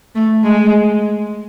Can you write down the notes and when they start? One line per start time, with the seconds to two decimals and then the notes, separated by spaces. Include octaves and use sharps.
0.15 A3
0.44 G#3